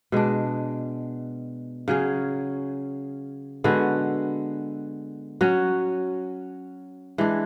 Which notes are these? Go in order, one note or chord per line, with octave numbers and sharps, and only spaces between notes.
B2 G#3 D4
C#3 F#3 C#4 G#4
D3 G#3 B3 F#4
F#3 C#4 F#4
E3 G#3 D4